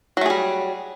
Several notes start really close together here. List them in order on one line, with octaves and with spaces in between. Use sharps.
F#3 A3 G#4 G3